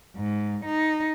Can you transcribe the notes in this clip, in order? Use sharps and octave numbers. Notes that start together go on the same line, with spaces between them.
G#2
D#4